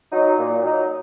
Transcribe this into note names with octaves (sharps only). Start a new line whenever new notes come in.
F#3 D#4
A#2
F#3 D#4